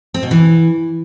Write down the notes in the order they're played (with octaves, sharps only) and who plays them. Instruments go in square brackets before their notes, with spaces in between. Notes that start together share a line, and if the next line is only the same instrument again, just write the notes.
[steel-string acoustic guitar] C4
B2
E3